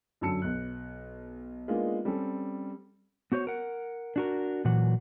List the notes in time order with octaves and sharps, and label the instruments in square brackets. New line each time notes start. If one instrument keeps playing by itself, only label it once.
[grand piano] F#2 D3 F#3 A5 E6 C#7
B1 F#6
G#3 A#3 B3 D4 D#4 F4
G3 C4 C#4 A4
[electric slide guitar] B3 F#4 C5 C#5
A#4 F#5
D4 F#4 A#4
A#2 E3 F#3 F#5